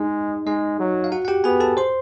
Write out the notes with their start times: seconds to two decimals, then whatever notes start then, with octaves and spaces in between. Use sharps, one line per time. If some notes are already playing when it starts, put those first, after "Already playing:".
Already playing: G#3 D#4 D#5
0.46 G#3 D#4 D#5
0.79 F#3
1.04 F5
1.12 F#4 F#5
1.25 F#5
1.28 G4 G5
1.44 B3 G#4 G#5
1.60 A4 A5
1.77 C5 C6